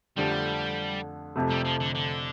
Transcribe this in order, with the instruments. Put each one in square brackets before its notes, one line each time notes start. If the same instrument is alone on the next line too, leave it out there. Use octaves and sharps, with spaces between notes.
[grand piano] F2 D3 A3 D4 G4 [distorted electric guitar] G3
[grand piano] F2 C3 A3
[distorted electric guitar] G3
F3
D3
D3